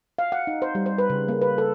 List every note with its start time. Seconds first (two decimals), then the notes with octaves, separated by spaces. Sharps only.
0.19 F5
0.32 F#5
0.47 D#4
0.62 C5
0.75 G3
0.86 C5
0.98 B4
1.10 C#3
1.28 A#3
1.42 B4
1.58 A4